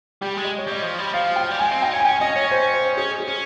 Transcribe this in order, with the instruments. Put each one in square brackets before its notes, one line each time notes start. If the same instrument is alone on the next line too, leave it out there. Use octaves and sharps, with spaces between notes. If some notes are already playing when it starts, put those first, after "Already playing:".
[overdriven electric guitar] G3 [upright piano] G4
[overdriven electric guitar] G#3
[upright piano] D#5
C#5
[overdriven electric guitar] G3 [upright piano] D#5
[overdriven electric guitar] F3
G3
[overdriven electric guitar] F3 [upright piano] F5
[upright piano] G5
[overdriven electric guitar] G3
[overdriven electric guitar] G#3 [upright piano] G#5
[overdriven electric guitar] C4
[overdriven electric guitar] D#4 [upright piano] G5
[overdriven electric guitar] C#4
[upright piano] G#5
[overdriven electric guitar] C#4 [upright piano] G5
[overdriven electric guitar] C#4 [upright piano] D#5
[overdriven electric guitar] C#4 [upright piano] C#5
[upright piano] C5
C5
[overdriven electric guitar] C#4 [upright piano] G#4
[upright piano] G#4
[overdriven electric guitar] C#4